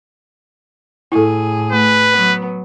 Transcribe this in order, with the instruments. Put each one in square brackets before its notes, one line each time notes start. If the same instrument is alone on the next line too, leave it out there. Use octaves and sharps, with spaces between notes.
[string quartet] A2 G#4 [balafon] E4 A4
[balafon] A3 [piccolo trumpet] B4
[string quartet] F#3 B3